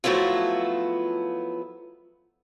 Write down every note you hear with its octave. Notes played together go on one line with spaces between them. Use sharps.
F3 F#3 A3 B3 E4 F4